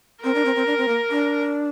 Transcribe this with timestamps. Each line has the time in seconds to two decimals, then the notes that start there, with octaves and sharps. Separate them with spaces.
0.23 C4 A#4
0.35 D4
0.45 C4
0.56 C4
0.66 D4
0.78 C4
0.88 A#3
1.10 D4